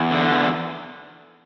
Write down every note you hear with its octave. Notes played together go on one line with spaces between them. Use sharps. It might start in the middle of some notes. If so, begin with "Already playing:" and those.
Already playing: E2
D3
E2